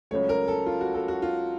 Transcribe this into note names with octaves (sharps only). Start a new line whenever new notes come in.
C#2 C#3 F#3 A3 C#5
A#4
A4
F4
F#4
A4
F#4
F4